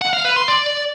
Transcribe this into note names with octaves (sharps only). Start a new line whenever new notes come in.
F#5
F5
B4
C6
D5